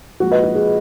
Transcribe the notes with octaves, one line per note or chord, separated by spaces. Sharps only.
A#2 F3 G#3 F#4
B4 D#5
F#4
G#4